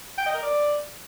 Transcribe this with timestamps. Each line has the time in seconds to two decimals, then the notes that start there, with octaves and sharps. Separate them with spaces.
0.18 G5
0.26 D#5
0.34 A#4
0.42 D5